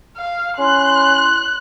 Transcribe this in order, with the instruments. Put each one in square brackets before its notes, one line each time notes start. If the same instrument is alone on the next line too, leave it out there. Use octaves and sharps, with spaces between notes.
[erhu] F5
[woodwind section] C#4 E4 C6 [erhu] F#6